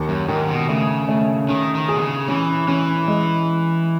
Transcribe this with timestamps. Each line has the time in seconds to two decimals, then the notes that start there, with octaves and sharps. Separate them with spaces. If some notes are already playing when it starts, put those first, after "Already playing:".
Already playing: D#2
0.09 F#2
0.28 G#2 D#3
0.49 B2
0.69 C#3 A3
1.09 A3
1.49 D#3 C#4
1.75 D#3
1.89 G#4
1.95 B2
2.02 C#3
2.28 E3 C#4
2.68 E3 C#4
3.07 G#3